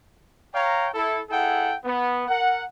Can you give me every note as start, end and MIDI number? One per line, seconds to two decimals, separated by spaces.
0.54 0.88 73
0.54 0.88 77
0.54 0.88 79
0.54 0.88 82
0.94 1.20 64
0.94 1.20 69
1.30 1.75 64
1.30 1.75 68
1.30 1.75 69
1.30 1.75 78
1.30 1.75 79
1.84 2.25 59
2.28 2.63 70
2.28 2.63 78